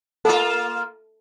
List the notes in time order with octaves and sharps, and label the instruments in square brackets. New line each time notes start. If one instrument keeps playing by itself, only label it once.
[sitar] A#3 F4 [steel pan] A4